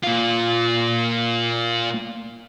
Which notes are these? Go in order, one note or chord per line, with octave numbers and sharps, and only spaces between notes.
A#2 F4